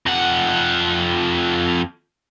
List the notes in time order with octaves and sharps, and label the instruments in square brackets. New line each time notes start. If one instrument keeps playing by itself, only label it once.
[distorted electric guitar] F2 F#5